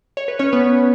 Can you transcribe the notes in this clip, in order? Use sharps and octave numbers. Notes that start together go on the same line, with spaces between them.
C#5
B4
C#4 C#5
B3 B4